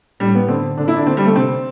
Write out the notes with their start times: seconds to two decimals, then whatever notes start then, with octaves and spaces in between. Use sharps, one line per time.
0.20 A2 G3
0.35 B3
0.48 D3 C4
0.78 D3 D4
0.88 E4
0.97 D4
1.06 D3 C4
1.17 G3
1.26 A3
1.36 C3 C4